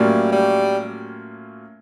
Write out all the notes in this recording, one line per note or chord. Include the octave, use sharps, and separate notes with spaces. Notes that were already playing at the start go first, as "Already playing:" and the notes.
Already playing: A2 F#3 G3 A#3 C#4 F4
G3